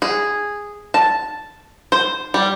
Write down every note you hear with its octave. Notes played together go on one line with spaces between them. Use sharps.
G#4
A5
C5
G3